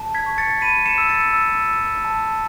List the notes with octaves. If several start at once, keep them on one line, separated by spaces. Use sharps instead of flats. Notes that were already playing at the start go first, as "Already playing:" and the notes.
Already playing: A5
G#6 B6
C#6
A6 C#7
B5 B6 D#7
C#7 E7
E6
A6 C#7
E6
E6
A5